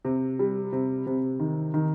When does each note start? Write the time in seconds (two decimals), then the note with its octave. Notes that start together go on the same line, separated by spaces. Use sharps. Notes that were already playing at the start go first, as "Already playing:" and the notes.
0.05 C3
0.39 G3
0.73 C3
1.06 C3
1.40 D#3
1.74 D#3